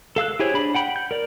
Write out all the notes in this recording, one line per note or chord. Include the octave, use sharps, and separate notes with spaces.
A4 F5 E6 F#6
E4 G4 G#4 C5 C#5
D4 B5
F#5 G5 B5
G6
A#4 D5